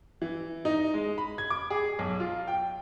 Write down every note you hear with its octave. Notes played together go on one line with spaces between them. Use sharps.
E3
D#4
G#3
B5
G#6
D6
G#4
B1
F4
G5